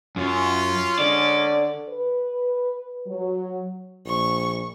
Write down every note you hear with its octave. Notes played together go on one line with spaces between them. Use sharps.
F#2 C#4 F4
D3 G#3 C#4 D5
B4
F#3
A#1 C#6